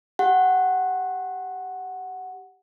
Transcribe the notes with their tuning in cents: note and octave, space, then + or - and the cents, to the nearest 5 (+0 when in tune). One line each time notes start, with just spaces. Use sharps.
G4 +0 F#5 +0